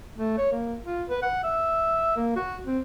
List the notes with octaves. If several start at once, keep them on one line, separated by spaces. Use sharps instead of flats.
A3
C#5
A#3
F4
B4
F#5
E5
A#3
F#4
C4